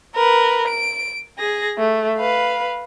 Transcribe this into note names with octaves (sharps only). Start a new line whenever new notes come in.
A#4 B4
D7
G#4 A#6
A3
B4 F5